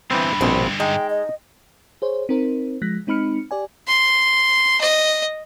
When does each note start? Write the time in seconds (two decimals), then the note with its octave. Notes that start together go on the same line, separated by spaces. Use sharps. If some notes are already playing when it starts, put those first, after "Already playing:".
0.11 G2 D3 E3 B3 C4 B5
0.41 A#1 B2 C4 G#5
0.80 G#3 D#4 G5
1.10 D#5
2.02 G#4 C5 C#5
2.29 C4 D#4 A#4 C5
2.82 F3 G#3 F#6 A#6 B6
3.07 G#3 C4 D#4 B5 F6 C#7
3.51 G4 D5 G#5
3.87 C6
4.81 D#5